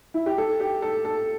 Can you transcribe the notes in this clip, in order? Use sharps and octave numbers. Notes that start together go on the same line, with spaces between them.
E4
G4
A4
G4
A4
A4